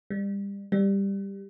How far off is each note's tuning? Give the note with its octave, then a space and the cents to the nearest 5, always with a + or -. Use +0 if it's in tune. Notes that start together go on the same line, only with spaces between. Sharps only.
G3 +30
G3 +10